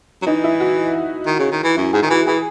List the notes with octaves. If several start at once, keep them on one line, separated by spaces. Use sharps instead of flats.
F#3
E3 D#4
E4
F#4
D#3
C#3
D#3
E3
F#2 E4
G#2 G#4
D#3
E3 F#4
E3 G#4